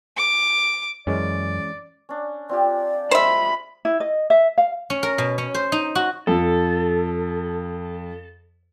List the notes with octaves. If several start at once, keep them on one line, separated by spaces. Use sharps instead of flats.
D6
F#2 E3 G#3 C#4 D5
C#4 D4
C4 F4 G4 D5
G#3 C5 E5 F5 B5
E4
D#5
E5
F5
C#4
A#4
B2
C#4
C5
D#4
F#4
F2 A4